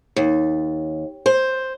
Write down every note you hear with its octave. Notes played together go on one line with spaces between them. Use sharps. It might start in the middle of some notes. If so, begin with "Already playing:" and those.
D#2
C5